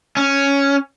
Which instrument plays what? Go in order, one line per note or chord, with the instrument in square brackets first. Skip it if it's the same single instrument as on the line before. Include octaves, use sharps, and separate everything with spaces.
[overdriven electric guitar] C#4